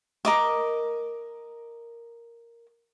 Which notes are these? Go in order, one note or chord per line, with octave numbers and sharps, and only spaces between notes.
A#4 D#5 D6